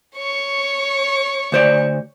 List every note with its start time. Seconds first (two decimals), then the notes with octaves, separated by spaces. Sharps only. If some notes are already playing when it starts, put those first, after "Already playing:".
0.16 C#5 C#6
1.52 D2 C5 D5